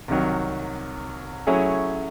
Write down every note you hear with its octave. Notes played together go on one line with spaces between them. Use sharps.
C2 C3 D#3 F#3
F#3 A3 C#4 E4 G#4